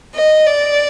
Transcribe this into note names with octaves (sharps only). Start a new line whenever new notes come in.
D#5
D5